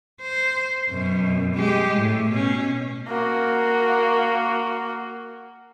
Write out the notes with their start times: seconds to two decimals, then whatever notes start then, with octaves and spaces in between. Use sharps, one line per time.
0.21 C5
0.89 F#2 B2
1.54 G#3 G4
1.97 A2
2.30 B2 C#4
3.08 A#3 F#4